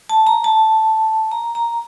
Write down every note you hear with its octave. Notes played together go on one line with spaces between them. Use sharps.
A5
A#5
A5
A#5
A#5